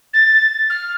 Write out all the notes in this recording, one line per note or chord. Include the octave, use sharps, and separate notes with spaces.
A6
F6